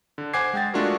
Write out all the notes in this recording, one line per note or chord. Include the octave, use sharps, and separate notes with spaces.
D3
C5 F#5 G#5 D6 G#6 C7
G#3 G5 A6
G#3 A3 D4 F4 F#4 A#4